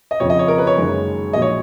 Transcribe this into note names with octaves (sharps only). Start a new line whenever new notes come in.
D#5
F2 C#3 F3 C#5
D#5
C#5
A#4
B4
C#5
F#1 F#2 D#3 G#3
A#1 A#2 F#3 D#5
C#5